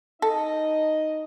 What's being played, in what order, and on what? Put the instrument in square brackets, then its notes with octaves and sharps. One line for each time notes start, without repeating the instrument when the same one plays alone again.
[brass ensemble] D#4 D#5 [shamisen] A4